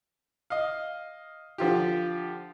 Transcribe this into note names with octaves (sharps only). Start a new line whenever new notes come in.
D#5 F5
D3 F3 F4 G4